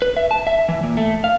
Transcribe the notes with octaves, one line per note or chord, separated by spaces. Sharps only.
B4
E5
A5
E5
E3
A#2
A3
F5